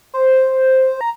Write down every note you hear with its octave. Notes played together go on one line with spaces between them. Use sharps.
C5
A#5